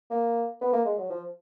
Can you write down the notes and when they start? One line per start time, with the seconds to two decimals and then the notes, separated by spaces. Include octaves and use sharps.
0.11 A#3
0.61 B3
0.73 A#3
0.85 G#3
0.98 F#3
1.10 F3